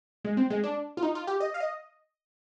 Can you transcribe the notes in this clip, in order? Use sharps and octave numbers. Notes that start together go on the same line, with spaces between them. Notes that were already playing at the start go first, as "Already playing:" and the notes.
G#3
C4
G#3
D4
F4
D#4
F4
G4
D#5
F5
D#5